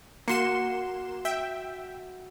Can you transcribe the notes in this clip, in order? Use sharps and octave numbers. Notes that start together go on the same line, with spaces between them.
A#3 F#4 C6 C#7 E7
E5 G5